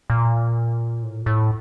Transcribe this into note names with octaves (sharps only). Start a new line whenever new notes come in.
A#2
A2
A#2
A2